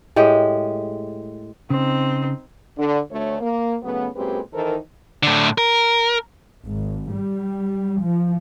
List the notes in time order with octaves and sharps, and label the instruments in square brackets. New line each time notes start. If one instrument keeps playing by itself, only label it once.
[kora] A2 G#3 G4
[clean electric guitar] C#3 [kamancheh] C4 D#4
[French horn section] D3
D2 A3 C#5
A#3
C#3 F#3 A3 B3
F#2 A#2 G#3 C4 G4 B4
D#3 E3 D#4 A4 A#4 C5
[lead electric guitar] A2 D3
A#4
[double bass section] G#1
G3
F3